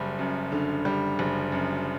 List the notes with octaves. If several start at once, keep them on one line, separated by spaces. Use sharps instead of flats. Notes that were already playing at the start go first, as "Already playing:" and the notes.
Already playing: F#1 G3
F#2
D3
G3
F#1
F#2